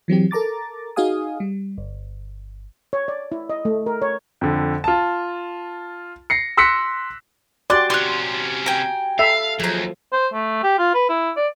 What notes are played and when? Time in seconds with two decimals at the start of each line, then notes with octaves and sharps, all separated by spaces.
0.08 E3 F#3 C4 G4
0.31 A4 A#4 A#5 D6 A6
0.96 D#4 F#4 G#4 F5 G#5 D#6
1.40 G3
1.78 G1
2.93 C#5
3.08 D5
3.32 E4
3.50 D#5
3.65 A3
3.86 A#4
4.02 C#5
4.41 F2 D3
4.84 F4 A5
6.30 A#6 C7 C#7
6.57 C6 E6 F#6 A#6 B6 C#7
7.70 F#4 G4 D5 C6 F#6
7.90 C3 C#4 C6 D6 F#6
8.66 G5 G#5 A#5
9.19 A4 E5 F5
9.60 D#2 F3 F#3 G#4 A#5
10.12 C5
10.33 A3
10.63 G4
10.78 F4
10.94 B4
11.09 E4
11.36 D5